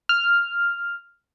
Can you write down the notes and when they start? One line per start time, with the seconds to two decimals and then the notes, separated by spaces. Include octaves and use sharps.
0.09 F6